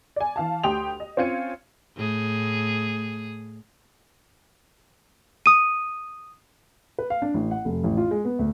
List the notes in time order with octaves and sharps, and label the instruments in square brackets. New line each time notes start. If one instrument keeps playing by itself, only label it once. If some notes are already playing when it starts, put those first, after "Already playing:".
[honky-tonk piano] D5 G#5
E3 F5 A5
D2 G4 G5 C6 D#6 F7
D#5
C4 C#4 F4 G#6 C#7 D#7
[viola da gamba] A2 G#4
[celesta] D#6 D#7
[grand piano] B4
F5
D4
A1
F#5
F1
A1
F4
G#3
B3
D2